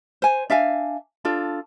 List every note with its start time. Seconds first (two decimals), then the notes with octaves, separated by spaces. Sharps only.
0.22 C5 G#5
0.50 D4 E5 F5 G#5
1.25 D4 F4 A4